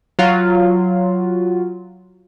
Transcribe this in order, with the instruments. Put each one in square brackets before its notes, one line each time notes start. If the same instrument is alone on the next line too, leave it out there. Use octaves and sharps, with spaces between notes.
[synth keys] F#3 F4